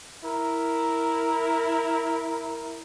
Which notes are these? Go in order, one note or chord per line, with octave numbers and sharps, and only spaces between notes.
E4 A#4